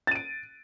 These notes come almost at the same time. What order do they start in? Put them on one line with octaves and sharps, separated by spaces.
A6 D#7 D7